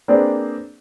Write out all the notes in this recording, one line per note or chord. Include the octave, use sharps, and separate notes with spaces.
A#3 C4 D4 G#4 B4 D5